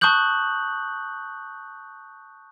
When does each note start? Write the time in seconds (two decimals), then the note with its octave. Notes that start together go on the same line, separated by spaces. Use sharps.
0.01 A5 C#6 D#6 F#6 G6 F#7